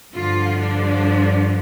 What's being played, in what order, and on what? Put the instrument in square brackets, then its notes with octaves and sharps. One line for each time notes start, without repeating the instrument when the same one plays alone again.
[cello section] G2 D3 F3 F4
D4